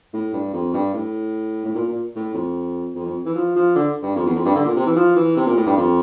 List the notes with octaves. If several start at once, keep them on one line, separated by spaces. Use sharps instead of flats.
A2
G2
F2
G2
A2
A2
A#2
A#2
A2
F2
F2
F2
E3
F3
F3
D3
G2
F2
E2
F2
G2
D3
A#2
C3
E3
F3
E3
C3
A#2
A2
G2
F2